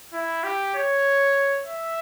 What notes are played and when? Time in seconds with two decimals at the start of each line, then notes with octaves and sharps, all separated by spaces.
0.13 E4
0.44 G4
0.75 C#5
1.65 E5